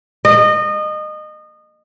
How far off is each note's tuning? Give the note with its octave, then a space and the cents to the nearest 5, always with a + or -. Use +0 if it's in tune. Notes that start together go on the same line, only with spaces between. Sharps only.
D#5 -25